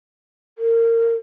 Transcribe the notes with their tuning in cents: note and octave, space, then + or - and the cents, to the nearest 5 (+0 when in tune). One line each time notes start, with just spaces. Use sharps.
A#4 -25